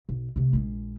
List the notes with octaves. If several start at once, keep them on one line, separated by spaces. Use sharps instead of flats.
B1
C3 A3
A#1 G#3